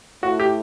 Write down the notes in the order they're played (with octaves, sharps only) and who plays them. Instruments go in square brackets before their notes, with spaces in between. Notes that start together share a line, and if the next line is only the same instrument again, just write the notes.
[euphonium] A2 [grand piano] F#4
[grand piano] G4